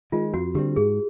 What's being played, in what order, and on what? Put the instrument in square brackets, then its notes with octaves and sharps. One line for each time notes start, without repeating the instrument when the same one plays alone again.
[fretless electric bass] D#3 G#3 [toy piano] F4
[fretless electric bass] F2 [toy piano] F#4
[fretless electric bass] D3 G3 C4 [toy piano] G4
[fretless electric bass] G#2 [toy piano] G#4